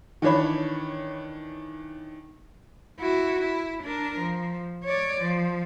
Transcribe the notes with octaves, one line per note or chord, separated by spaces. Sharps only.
D#3 E3 D4 C#5 B5
E4 F#4
E4
D4 A#4
F3
C#5 D5
F3